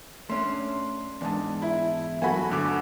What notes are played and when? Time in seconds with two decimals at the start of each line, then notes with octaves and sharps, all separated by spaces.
0.30 A3 C#4 D4 C6
1.21 E2 G#2 G#3 D4 A5
1.62 E4
2.22 F#3 A3 F#4 G#5 B5
2.50 G1 D3 D6